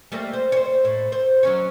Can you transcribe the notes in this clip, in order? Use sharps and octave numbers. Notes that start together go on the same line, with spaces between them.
G3 A3 A#3
C5
C5 C#5
A2
C5
F#3 C#4 C#5